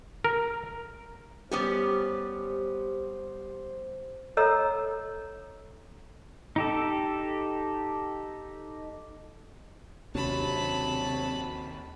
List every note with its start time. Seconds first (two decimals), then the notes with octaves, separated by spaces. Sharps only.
0.24 A#4
1.51 G3 B3 C#4 G4 C5
4.37 A4 C#5 D#5 A#5 E6
6.56 D#4 G4 A4
10.15 D#2 C3 F#3 C#4 D4 A5 B5